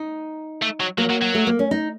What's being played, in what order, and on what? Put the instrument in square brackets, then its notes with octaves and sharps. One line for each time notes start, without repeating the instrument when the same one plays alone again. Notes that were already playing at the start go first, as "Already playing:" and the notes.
Already playing: [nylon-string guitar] D#4
[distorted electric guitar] A3
F#3
[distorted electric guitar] F#3 [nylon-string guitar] A#3
[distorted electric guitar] F#3
F#3
[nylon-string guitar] A3
A#3
C#4
D#4